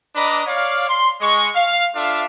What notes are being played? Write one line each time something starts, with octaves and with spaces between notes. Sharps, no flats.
D4 B4 D5 D#5 A#5 B5
C#5 D5 F5
C6
G#3 C#6
F5
D4 F4 A4 E5 F5